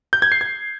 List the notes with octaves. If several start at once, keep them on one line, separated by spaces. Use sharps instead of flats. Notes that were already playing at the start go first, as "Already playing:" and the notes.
G6
G#6
C7
G#6